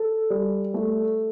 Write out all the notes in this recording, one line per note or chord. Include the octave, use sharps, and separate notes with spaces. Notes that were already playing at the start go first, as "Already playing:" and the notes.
Already playing: A4
G3
A3